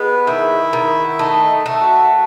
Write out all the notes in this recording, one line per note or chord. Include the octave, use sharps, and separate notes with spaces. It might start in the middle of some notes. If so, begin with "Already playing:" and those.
Already playing: G#3 B3 B4
D#3 E4 E5
D#3
F#5
E5
A3 D#4 D#5
A3 E5
F#4 F#5